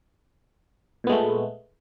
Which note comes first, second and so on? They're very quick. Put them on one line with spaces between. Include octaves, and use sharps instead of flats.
A#2 B3 G#3 A3